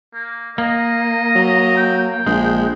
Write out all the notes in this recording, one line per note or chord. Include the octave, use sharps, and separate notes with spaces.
A#3
A#3 D#5
F#3
G5
A#1 G#3